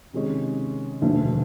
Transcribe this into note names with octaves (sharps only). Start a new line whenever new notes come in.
C3 D#3 G#3 C#4
E1 D2 D3 F3